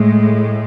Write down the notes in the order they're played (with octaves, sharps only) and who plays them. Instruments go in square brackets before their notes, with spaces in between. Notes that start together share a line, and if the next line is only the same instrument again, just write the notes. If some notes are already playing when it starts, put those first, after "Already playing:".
Already playing: [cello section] A2 G#3